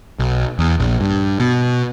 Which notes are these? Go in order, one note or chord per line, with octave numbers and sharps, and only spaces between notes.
B1
E2
A#1
G2
B2